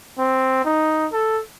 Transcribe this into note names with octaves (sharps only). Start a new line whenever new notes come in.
C4
D#4
A4